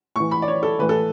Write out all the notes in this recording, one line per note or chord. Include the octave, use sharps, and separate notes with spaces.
A2 E3 C#6
B5
D5
C#5
A4
A2 E3 B4
A4